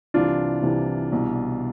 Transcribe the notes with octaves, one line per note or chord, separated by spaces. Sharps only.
C2 C3 E3 D4 F4
C2 C3 E3
C2 B2